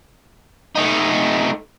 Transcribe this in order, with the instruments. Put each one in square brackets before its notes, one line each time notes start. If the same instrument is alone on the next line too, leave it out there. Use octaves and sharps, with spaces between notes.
[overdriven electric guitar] A3 D#4